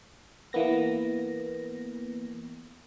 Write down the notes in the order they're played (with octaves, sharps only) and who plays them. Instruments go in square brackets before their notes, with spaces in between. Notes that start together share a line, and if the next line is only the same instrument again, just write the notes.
[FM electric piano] E3 A#3 B3 A#6